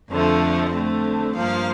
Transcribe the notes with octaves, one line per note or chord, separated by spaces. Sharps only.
F2 D3 F3 A3
D3 A3 C4
G2 F3 A#3 F5